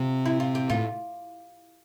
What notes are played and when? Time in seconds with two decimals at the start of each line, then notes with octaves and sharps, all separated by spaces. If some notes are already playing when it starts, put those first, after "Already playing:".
Already playing: C3 F4
0.26 E4
0.40 F4
0.55 G4
0.70 A2 F4